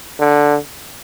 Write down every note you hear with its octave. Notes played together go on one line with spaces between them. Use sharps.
D3